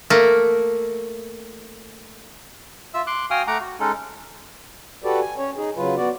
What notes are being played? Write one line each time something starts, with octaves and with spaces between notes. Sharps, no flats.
A3 A#3
F4 E5 E6
C6 D6 F#6
F#4 F5 G5 G#5 D#6 F6
A3 F#5 A#5 D6
F#4
G#3 C#4 D#4 A4
F#4 G4 A4 B4 D5
G#5
C#4 C#5
D#4 G#4
C#3 F#3 F4 B4
B3 F#4 D5